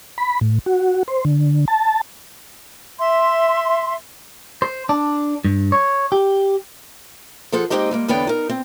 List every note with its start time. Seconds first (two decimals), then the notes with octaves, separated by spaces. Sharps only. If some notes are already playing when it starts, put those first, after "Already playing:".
0.18 B5
0.41 A2
0.66 F#4
1.08 C5
1.25 D3
1.68 A5
2.99 E5 C6
4.62 C5
4.89 D4
5.45 G2
5.72 C#5
6.12 G4
7.52 F3 G#4 A4 C5 F#5
7.70 G#3 A#3 C4 D#4 G4 D#5
7.91 G3 G#3 A#3
8.08 E2 D3 B3 C#5 D5 G5
8.27 D#4 A#4
8.49 C4